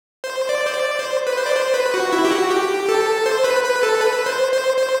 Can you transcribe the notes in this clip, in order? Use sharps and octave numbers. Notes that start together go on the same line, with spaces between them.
C5
D5
C5
D5
C5
B4
C5
D5
C5
B4
F#4
E4
G4
F#4
G4
A4
C5
B4
B4
A4
B4
C5
C5
C5